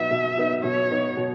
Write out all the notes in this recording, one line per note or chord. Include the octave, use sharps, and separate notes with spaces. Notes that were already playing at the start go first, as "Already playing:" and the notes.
Already playing: B2 F#3 B3 D#4 E5
B2
F#3 B3 D#4
B2 C#5
F#3 B3 D#4
B2